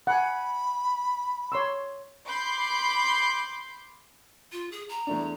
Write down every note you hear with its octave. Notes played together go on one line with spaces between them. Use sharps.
F#5 G#5 B5
C#5 C6 E6
B5 C6 D6 G6 C7
F4
G#4
A#5
E2 A3 D4